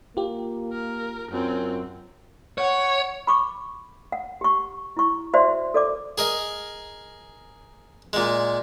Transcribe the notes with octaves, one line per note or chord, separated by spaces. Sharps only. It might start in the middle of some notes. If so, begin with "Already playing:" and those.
A#3 F4 G4
A#4
F#2 C4 F4
C#5 F#5
B5 C#6 D6
F#5
G4 C#6
E4 C#6
F#4 C5 D5 E5 C6
A4 D5 D6
G#4 A#4 D#5
A#2 G#3